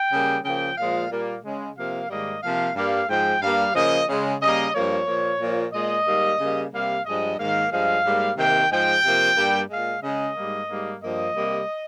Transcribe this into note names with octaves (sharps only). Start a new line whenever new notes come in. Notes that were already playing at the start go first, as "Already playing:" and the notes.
Already playing: G5
C#3 G3 A#3
C#3 F3 A#3 G5
A#2 F3 G#3 F5
A#2 G3 A#3
C#3 G#3
C3 F3 A#3 F5
G#2 D#3 G3 A#3 D#5
C3 F3 A#3 F5
G2 G3 A#3 F5
G#2 F3 G#3 G5
G2 G3 A#3 F5
C#3 F3 A#3 D#5
C#3 G#3
C#3 G3 A#3 D#5
G2 F3 A#3 C#5
A#2 F3 A#3
A#2 F3 A#3
A#2 G#3 D#5
G#2 G3 A#3
C#3 G3 A#3
C3 G3 A#3 F5
G2 F3 G#3 D#5
G#2 D#3 A#3 F5
G2 F3 G#3 F5
G#2 G3 A#3
C3 D#3 A#3 G5
G#2 F3 G#3 G5
C3 F3 A#3
G2 G3 A#3
A#2 G#3 F5
C#3 G#3 D#5
G#2 G3 A#3
G#2 G3 A#3
G2 F3 A#3 D#5
C3 G3 A#3